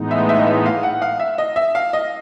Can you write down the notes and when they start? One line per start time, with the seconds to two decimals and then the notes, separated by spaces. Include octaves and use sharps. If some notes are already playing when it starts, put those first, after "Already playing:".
Already playing: A2 E3 G#3 B3 D#4
0.11 E5
0.29 E5
0.39 D#5
0.47 E5
0.66 F5
0.83 F#5
1.02 F5
1.20 E5
1.38 D#5
1.56 E5
1.75 F5
1.93 D#5